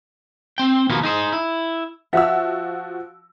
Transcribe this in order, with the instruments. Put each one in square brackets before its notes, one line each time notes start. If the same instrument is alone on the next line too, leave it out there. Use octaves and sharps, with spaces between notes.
[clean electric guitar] C4 G5
D#2 B2 F3 A#3 B3
D#4 G#4 C5
E4
[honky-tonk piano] F3 F#4 E6 [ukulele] E5 F#5